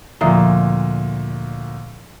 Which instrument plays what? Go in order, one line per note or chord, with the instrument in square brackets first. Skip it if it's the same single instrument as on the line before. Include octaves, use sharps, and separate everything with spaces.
[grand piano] D2 A#2 [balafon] F3 E5 A#5